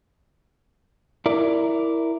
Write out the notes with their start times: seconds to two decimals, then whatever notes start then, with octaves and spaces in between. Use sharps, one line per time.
1.26 E4 A#4 D5